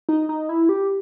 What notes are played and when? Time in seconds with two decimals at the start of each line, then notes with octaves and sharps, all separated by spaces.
0.09 D#4
0.29 D#4
0.49 E4
0.69 G4